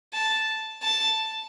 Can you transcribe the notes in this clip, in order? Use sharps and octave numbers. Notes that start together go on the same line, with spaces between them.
A5
A5